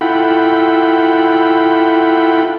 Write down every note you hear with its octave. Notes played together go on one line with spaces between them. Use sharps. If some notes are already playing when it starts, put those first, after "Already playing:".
E4 F4 A4 F#5 G5 B5